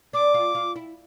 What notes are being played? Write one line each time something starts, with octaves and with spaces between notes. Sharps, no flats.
D4 D6
F4
F4
E4